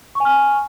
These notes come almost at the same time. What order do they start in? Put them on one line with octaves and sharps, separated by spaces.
C#6 G#5 F6